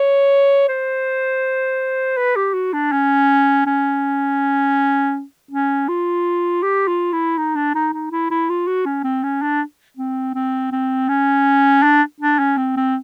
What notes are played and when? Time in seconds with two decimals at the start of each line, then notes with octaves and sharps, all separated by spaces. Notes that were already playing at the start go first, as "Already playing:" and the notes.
Already playing: C#5
0.69 C5
2.17 B4
2.36 G4
2.54 F#4
2.73 D4
2.92 C#4
3.66 C#4
5.51 C#4
5.89 F4
6.63 G4
6.88 F4
7.13 E4
7.38 D#4
7.55 D4
7.75 D#4
7.94 D#4
8.11 E4
8.31 E4
8.49 F4
8.67 F#4
8.85 C#4
9.04 C4
9.24 C#4
9.42 D4
9.97 C4
10.35 C4
10.72 C4
11.09 C#4
11.83 D4
12.21 D4
12.39 C#4
12.57 C4
12.77 C4